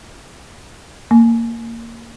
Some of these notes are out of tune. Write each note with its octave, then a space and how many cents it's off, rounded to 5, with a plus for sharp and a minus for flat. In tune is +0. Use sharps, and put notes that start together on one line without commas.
A#3 -15